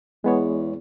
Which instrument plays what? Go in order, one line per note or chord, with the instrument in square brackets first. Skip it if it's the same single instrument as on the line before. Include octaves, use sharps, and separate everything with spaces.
[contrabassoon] E2 [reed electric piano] G#3 B3 C#5